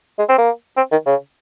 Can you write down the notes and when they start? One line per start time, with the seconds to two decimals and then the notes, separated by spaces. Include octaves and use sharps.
0.19 G#3
0.29 C4
0.38 A#3
0.77 C4
0.92 D#3
1.06 C#3